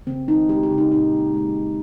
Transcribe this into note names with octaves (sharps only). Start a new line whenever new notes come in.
C#3 C4
G#3 D#4
G#3 G4
G4
C#3
D#4
A#2 D#4
G#3
G#3